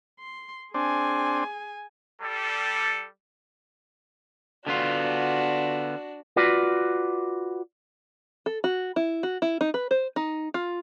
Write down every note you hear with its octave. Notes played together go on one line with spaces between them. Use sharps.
C6
C4 D4 G#4 G#5
G3 A4
D3 B3 D4 F4 F#4
F4 F#4 B4 D5
A4
F#4
E4
F#4
E4
D#4
B4
C5
D#4
F4